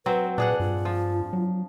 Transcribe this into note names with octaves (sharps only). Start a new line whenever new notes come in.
F#3 C4 B4
A#2 D4 G#4 B4 F#5
G2 F4
F3
F#3